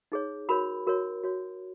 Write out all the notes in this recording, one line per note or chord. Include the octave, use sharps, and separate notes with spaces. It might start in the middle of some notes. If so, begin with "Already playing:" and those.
D#4 G#4 C#5
F#4 A#4 C#5 B5
F#4 A#4 C#5
F#4 C#5